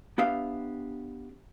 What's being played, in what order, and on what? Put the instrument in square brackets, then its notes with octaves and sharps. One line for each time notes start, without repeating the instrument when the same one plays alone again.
[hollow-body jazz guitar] B3 D4 G4 E5 F5